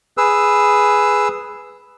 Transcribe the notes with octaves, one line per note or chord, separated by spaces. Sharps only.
G#4 B4 E6